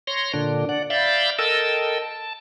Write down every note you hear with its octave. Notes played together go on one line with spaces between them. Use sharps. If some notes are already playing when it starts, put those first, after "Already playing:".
C#5 C6 A#6
A#2 D3 D4
D5 F#5
D5 E5 F5 B5 G6 A6
A4 A#4 D#5 G5 A5 E6
A5